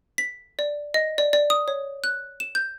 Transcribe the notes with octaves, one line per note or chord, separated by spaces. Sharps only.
B6
D5
D#5
D5
D5
D#6
C#5
F#6
E7
G6